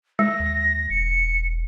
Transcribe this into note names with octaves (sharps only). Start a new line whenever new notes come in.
G#3 A#6
D#2
E1 C#7